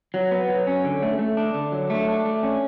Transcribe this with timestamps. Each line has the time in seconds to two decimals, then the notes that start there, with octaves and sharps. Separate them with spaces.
0.14 F#3
0.31 B3
0.49 F#3
0.67 C#4
0.84 D3
1.03 A3
1.19 A3
1.37 D4
1.55 D3
1.72 F#3
1.90 A3
2.08 D4
2.25 A3
2.43 C#4